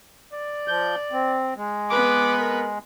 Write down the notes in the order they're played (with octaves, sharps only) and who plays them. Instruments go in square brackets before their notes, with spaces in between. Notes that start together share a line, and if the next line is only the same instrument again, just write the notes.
[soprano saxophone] D5
[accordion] F3 G6
C4
G#3
[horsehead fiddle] B3 B4 [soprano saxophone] D6
[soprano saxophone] A#4